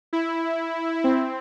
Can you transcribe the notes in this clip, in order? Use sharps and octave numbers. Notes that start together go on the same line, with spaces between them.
E4
C4